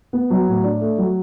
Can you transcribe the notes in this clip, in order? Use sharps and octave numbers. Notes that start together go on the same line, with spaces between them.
B3
F#3
A2
D4
A3
F#3